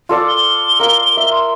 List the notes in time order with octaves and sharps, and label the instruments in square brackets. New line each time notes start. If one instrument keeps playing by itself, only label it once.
[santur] F4 A4 D5
[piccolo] G7
[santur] A#4 F5
E5
[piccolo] C6